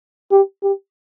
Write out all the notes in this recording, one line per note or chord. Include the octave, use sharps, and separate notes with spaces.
G4
G4